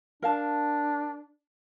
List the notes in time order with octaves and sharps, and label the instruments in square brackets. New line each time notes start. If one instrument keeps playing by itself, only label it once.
[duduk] D4 [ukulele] A#4 F5 A5